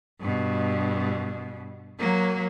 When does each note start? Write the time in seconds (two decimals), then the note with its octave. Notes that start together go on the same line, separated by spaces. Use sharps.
0.20 G2 B2
1.99 F#3 A#3